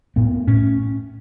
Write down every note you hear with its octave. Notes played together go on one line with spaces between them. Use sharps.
A2 B3
A2 C#4